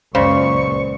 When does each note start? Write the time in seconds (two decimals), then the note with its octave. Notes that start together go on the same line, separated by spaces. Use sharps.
0.15 C#2 F#2 A#2 C#3 C5 D5 C#6